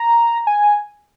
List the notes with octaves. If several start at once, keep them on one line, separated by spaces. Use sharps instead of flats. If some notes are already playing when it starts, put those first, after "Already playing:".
Already playing: A#5
G#5